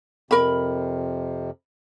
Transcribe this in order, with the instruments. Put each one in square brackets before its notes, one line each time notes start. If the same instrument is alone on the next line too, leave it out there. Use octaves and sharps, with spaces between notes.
[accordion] F2 C3 [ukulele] A#4 B5